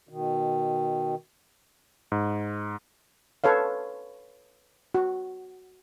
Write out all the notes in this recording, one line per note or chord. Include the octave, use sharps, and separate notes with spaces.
B2 D#3
G#2
A4 B4 C#5 F5
F#4